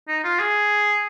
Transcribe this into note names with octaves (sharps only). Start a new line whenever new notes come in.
D#4
F4
G#4